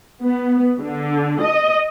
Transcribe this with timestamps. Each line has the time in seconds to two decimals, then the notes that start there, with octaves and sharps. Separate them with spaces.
0.22 B3
0.80 D3
1.41 D#5